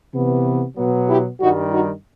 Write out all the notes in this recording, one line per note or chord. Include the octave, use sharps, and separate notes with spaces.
C3 E3 B3
B2 F#3 B3
E4 G4
G2 D#3 G3 D#4 F#4
D#4 F#4